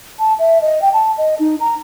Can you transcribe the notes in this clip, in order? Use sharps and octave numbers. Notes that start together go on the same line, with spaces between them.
A5
E5
D#5
G5
A5
D#5
D#4
A#5